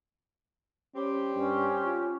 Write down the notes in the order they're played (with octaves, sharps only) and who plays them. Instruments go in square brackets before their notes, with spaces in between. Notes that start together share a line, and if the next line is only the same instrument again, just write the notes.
[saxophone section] G3 C4 G4 [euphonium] C#4
[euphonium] G2 [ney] C#4
[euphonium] F4